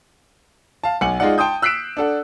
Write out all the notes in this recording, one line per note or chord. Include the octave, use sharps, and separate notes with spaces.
F5 A5
B1 F#5 G#5 C#7 F#7
G#3 D#4 F4 D5 F#5
G5 A5 C6 D#6 G6
E6 F#6 B6 C7 D7 E7
D4 A4 F#5